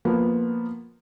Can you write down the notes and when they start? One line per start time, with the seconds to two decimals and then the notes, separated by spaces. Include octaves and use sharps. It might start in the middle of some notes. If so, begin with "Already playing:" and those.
0.05 F3 A#3 B3